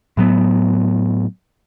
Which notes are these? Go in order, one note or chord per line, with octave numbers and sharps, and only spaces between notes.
A2 F#3 B3